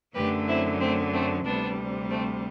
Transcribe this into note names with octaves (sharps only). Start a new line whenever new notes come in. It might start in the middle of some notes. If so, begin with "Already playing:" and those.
F#2 D3 F#3 A3 G4 B4
C4 E4
A3 C4
A3 C4
D2 C3 G3 B3 D4
A3 C4